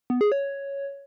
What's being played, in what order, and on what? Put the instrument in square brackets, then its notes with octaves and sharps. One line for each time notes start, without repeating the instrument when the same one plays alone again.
[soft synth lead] B3
G#4
C#5